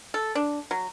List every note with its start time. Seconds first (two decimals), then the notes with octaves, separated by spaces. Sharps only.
0.14 A4
0.35 D4
0.71 F#3